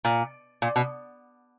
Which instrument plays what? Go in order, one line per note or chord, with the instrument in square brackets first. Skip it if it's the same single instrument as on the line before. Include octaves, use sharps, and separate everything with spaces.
[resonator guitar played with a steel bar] A#2
A#2
B2